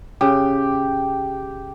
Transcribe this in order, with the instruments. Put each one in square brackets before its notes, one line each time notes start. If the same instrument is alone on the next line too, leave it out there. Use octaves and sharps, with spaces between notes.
[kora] C#3 [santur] G4